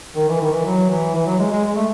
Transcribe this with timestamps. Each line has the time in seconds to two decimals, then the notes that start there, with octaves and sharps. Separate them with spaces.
0.16 D#3
0.29 E3
0.41 D#3
0.53 E3
0.65 F#3
0.90 E3
1.15 E3
1.26 F#3
1.39 G#3
1.51 G#3
1.64 G#3
1.76 A3